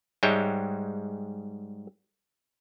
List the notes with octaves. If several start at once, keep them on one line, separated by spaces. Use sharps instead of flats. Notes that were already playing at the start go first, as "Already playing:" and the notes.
G#2 G3 G#3 C#5 E5 G5